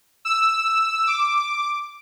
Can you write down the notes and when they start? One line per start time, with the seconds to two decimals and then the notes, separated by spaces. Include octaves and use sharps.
0.25 E6
1.07 D6